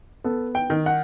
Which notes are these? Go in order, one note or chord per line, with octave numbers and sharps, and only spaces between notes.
B3 A4
G5
D#3
F#5